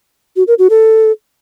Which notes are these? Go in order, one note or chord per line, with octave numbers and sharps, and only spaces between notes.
F#4
A#4
F#4
A4